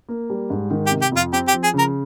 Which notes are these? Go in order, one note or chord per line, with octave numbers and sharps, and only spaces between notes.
A#3
G3
G#2
D#3
G4
C3
G4
F2 F4
C4 G4
G4
F3
G#4
C#3 A#4